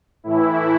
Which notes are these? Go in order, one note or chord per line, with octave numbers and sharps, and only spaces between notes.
A2 E3 E4